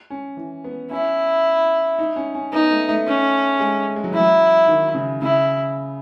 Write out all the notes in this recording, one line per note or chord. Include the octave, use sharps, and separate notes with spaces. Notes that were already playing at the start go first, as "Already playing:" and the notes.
C#4
E3
B3
C#4 E4
D#4
C#4
C#4
B3 D#4
A3
A3
C#4
G#3
G#3
F#3
E3 E4
F#3
D#3
C#3
C#3 E4